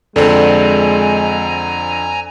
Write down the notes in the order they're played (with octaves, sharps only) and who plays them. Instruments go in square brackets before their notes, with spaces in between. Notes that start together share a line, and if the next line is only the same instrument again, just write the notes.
[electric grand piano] F2 D3 C4 [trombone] G#3 [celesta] A4 D5 [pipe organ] G#5 A#5